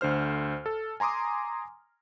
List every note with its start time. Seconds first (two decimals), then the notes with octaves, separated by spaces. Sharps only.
0.01 D2 D3 C5 F6
0.66 A4
1.00 G#5 A#5 C6 D6 D#6